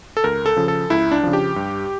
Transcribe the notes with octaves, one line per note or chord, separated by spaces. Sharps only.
A4
C#2 A#4
A4
C#3 F3
A4
C#2 E4
D4
C#3 F3
G4
G2